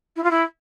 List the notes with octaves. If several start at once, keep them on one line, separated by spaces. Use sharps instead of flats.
E4
F4
E4